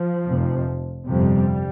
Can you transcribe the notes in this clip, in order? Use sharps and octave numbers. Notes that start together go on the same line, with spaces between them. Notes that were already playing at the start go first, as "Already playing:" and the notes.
Already playing: F3
F1 F2 C3
G1 F2 C3 G3